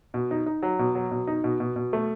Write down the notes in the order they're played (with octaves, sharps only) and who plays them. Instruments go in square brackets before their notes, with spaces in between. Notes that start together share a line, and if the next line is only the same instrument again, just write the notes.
[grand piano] B2
D#4
D#4
F#3
B2
F#3
B2
D#4
B2
B2
B2
A3